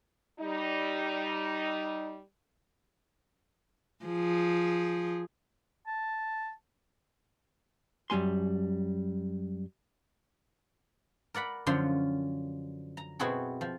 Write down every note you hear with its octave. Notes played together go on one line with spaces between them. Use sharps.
G3 D#4
F3 G#4
A5
F#2 G3 A#3 G#5 C6
A#4 D5 F#5 B5
F#2 D3 F3 C#4 C6
A#5
B2 C4 E4 F#4 G#4 A4
F3